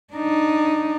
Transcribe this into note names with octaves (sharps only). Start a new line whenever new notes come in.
D4 D#4